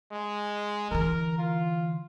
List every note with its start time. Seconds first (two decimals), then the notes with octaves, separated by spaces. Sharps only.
0.12 G#3
0.91 D3 E3 A#4
1.38 F4